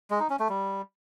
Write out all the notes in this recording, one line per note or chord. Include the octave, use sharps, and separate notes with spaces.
G#3
D#4
C#4
A3
G3